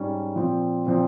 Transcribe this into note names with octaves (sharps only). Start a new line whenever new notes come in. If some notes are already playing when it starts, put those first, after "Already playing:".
Already playing: G#2 G3 C#4
A#2 F3 C4
A#2 F3 C4